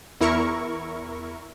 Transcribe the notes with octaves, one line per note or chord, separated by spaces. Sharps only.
E2 E4 A#4 C#6